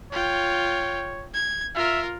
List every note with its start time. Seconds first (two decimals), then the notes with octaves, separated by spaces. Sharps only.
0.13 F4 C#5 G5
1.34 G#6
1.75 F4 A#4 E5